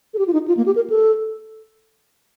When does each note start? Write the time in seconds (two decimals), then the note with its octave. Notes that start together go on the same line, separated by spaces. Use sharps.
0.14 A4
0.19 G4
0.27 F4
0.33 D#4
0.48 F4
0.57 A#3
0.66 G4
0.76 A#4
0.90 A4